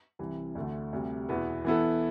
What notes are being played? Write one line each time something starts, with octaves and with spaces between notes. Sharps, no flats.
C2 C3 E3
D2 D3 A3
D2 C3 G3
E2 B2 B3 E4
E3 B3 E4 A4